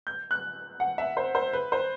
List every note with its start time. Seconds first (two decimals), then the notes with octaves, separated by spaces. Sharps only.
0.07 G6
0.31 F#6
0.80 F#5
0.98 E5
1.17 C5
1.35 C5
1.53 B4
1.72 C5